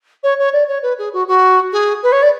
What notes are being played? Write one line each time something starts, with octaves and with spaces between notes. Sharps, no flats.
C#5
C#5
D5
C#5
B4
G#4
F#4
F#4
G#4
B4
C#5
D5